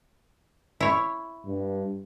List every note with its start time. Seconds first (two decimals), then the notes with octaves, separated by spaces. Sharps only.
0.80 E4 C#5
1.46 G2